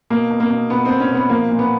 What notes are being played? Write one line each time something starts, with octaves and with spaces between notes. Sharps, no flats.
B2 A#3
B2
A#3
B2
B2 B3
B2 C4
C#4
B2 B3
F3 A#3
A#2
B3